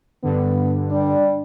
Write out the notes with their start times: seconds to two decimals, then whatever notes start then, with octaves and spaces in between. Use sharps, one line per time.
0.23 G2 D3 B3
0.90 G3 D4